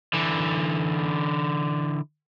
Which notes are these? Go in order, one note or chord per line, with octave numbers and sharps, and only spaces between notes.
D3 E3